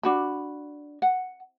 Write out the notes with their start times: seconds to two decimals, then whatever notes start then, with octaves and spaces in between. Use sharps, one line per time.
0.03 D4 F#4 B5
1.02 F#5